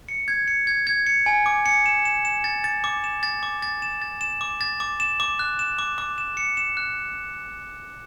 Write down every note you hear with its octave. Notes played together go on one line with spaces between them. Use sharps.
C#7
G#6
C#7
G#6
G#6
C#7
G#5
D6
C#7
E7
E7
E7
A6
A6
D6
E7
A6
D6
A6
E7
A6
E7
D6
A6
D6
E7
D6
F#6
E7
D6
D6
E7
C#7
E7
F#6